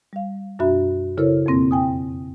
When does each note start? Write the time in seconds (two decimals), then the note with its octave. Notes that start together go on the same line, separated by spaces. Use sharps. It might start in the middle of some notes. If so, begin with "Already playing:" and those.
0.13 G3 F5
0.59 F#2 B2 D4 F#4 E5 B5
1.18 C#3 E4 A4 A#4 C5 C#5
1.46 F2 B2 A#3 C4 A#6
1.71 G5 G#5 D#6